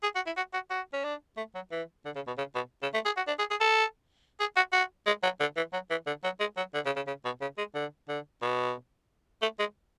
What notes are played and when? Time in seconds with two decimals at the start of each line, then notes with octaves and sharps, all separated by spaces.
0.03 G#4
0.15 F#4
0.26 E4
0.37 F#4
0.54 F#4
0.70 F#4
0.93 C#4
1.04 D4
1.37 A3
1.55 F#3
1.72 E3
2.05 D3
2.16 C#3
2.27 B2
2.38 C#3
2.55 B2
2.83 C#3
2.94 A3
3.05 G#4
3.17 F#4
3.27 D4
3.39 G#4
3.51 G#4
3.61 A4
4.40 G#4
4.56 F#4
4.72 F#4
5.07 G#3
5.23 F#3
5.40 D3
5.57 E3
5.73 F#3
5.90 E3
6.07 D3
6.24 F#3
6.40 G#3
6.57 F#3
6.74 D3
6.86 C#3
6.96 C#3
7.07 C#3
7.25 B2
7.41 C#3
7.58 G#3
7.75 D3
8.09 D3
8.42 B2
9.42 A3
9.59 G#3